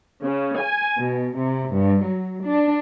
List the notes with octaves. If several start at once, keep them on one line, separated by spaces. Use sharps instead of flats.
C#3
G#5
B2
C3
G2
F#3
D4